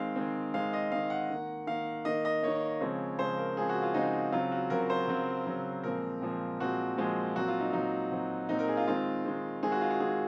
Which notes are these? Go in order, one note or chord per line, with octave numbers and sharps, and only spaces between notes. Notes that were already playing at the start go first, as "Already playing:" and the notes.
Already playing: D#3 G#3 C4 F5
D#3 G#3 C4
D#3 G#3 C4 F5
D#5
D#3 G#3 C4 F5
F#5
D#3 A#3
D#3 A#3 F5
D#3 A#3 D#5
D#5
D#3 A#3 C#5
C#3 F3 G#3 C4
C#3 F3 G#3 C4 C5
A#4
C#3 F3 G#3 C4 G#4
F#4
F4
C#3 F3 G#3 C4 D#4
C#3 F#3 C4 F4
F#4
C#3 F#3 C4 A#4
C5
C#3 F#3 C4
C#3 F#3 C4
A#2 F3 G#3 C4 A#4
A#2 F3 G#3 C4
A#2 F3 G#3 C4 F#4
A#2 F3 G#3 C4
A#2 F#3 C4 F#4
F4
D#4
A#2 F#3 C4 D#4
A#2 F#3 C4
A#2 F#3 C4 D#4
A#4
G#4
F4
D#3 G#3 C4 F4
D#3 G#3 C4
D#3 G#3 C4 G#4
F#4
F4
F#4
D#3 G#3 C4 G#4